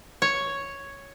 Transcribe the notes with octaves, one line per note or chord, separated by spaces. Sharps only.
C#5